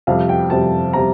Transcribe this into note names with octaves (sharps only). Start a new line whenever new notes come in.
F2 C3 G3 F5
G5
F2 C3 G3 A5
C3 G3 A#5